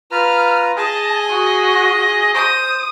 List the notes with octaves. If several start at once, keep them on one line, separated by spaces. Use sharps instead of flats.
F4 B4 A#5 F6
G#4 D#5 G#5 A5
F#4
C5 D#6